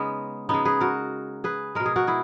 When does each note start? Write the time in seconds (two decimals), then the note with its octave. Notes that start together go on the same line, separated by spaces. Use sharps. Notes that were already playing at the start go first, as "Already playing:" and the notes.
Already playing: C#3 G#3 B3 C#4 D#4
0.49 C#3 G#3 B3 D#4
0.65 G#4 B4
0.81 F#4 A#4
1.44 G#4 B4
1.75 B2 G#3 A#4
1.86 G#4
1.96 F#4 A#4
2.07 E4 G#4